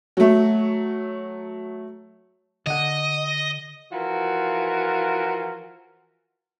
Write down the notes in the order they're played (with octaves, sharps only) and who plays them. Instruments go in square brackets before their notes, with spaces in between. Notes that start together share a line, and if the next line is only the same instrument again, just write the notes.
[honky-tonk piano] F#3 A3
[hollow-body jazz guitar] D3 F#5 [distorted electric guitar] D#5
[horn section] E3 F3 F4 F#4 A#4